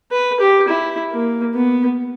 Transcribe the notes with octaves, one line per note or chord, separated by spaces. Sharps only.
B4
G4
E4
A#3
B3